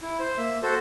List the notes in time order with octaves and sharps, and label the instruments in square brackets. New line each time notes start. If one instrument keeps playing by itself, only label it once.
[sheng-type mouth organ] E4
C5
A#3 E5
F#4 A4 C5